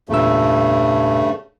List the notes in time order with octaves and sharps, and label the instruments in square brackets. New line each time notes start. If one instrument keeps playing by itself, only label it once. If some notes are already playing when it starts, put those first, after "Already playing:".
[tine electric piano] E2 A#2 E6 [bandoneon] G2 C#3 A3